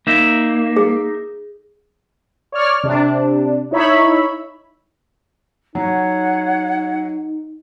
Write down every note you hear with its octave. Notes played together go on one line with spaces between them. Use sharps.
A#3 D#4 E5
G#4
C#5 D5 F6
C3 D4
D#4 E4 C#5 E5 B5
F#3 D#4 C#5 F#5